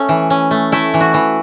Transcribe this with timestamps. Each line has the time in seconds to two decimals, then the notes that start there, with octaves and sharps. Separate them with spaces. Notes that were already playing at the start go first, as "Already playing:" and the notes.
Already playing: A3 C#4
0.09 E3
0.30 C#4
0.51 A3
0.72 A3 E4
0.94 E3
1.01 F#4
1.14 E3